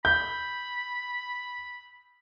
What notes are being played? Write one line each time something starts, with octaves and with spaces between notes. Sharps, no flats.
B5 G6